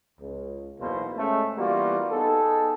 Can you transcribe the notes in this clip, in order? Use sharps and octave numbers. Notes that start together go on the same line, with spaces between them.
C#2
B1 E2 B2 A#3 C5
G#3 A3 C#4
E3 G3 A#3 B3 F4 F#4
B3 D#4 G#4 A4